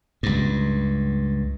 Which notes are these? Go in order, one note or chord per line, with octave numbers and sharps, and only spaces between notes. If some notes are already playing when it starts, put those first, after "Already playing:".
C#2 G2